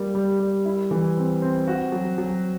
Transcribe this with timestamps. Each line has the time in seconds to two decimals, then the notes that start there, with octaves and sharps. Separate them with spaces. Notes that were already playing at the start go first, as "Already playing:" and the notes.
Already playing: G3 A#3
0.15 G3
0.40 G3
0.65 E4
0.91 E3
1.17 C4
1.42 C4
1.67 F#4
1.92 F#3
2.18 F#3